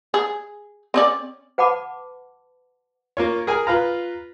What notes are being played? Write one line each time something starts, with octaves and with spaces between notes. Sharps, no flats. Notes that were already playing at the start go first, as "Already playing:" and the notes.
G#4
C4 C#4 D5
B4 F#5 A5 B5 D6
A#3 F4 C#5
G#4 A#4 G#5 F6
F4 B4 F5 A#5